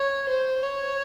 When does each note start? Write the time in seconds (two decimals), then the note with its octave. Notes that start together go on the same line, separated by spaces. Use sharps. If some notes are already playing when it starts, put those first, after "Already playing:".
Already playing: C#5
0.28 C5
0.62 C#5